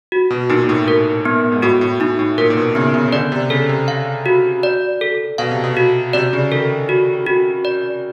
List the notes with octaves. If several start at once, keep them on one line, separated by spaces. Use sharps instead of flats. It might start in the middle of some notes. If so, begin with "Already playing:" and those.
F#4
B2
A#2 D#4
A#2
A2
A2 A#4
B3
G#2
A2 F#4
A2
A2 D#4
A2
A#2 A#4
A#2
B2
C#3 B3
C#3
C#3
D3 D5
C3
C#3 A4
C3
F5
F#4
D5
A4
B2 F5
C3
B2
F#4
C3 D5
C#3
D#3 A4
F#4
F#4
D5